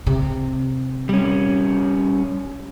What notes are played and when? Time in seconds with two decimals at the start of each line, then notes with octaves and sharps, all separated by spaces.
0.06 C3
1.09 G3 C#4